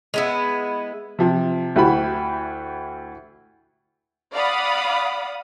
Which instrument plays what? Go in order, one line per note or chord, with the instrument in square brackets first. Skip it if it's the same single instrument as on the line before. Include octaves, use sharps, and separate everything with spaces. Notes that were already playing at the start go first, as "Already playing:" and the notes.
[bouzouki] G#3 B3 E4
[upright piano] C3 F3
D2 E4 F#4 G4 B5
[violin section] D5 F5 F#5 B5 D#6